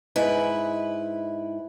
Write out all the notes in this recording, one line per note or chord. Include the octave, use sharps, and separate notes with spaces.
G#2 E4 B4